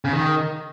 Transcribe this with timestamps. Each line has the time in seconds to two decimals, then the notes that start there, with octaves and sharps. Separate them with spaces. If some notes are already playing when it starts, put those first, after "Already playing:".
0.05 C#3
0.13 D#3